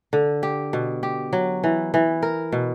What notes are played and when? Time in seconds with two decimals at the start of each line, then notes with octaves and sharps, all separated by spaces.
0.13 D3
0.43 G4
0.73 B2
1.03 G4
1.33 F#3
1.64 E3
1.94 E3
2.22 A#4
2.52 B2